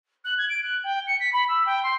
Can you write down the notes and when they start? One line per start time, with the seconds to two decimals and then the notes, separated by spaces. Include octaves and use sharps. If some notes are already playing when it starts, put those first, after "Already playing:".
0.24 F#6
0.38 G#6
0.49 D7
0.63 F#6
0.84 G5
1.07 C#7
1.20 B6
1.32 B5
1.48 E6
1.66 G5
1.83 C6